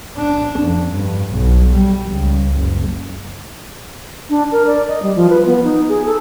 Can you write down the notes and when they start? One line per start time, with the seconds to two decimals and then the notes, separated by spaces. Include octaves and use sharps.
0.17 D4
0.60 F2
0.93 G2
1.34 B1
1.75 G3
2.11 C#2
2.56 F#1
4.30 D4
4.52 A#4
4.67 D5
4.88 D#5
5.03 G3
5.16 F3
5.30 B4
5.46 B3
5.64 D#4
5.89 G#4
6.06 A4